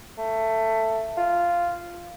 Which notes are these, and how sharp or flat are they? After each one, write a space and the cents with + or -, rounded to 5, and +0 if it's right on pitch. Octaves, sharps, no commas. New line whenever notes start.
A3 +15
F4 -5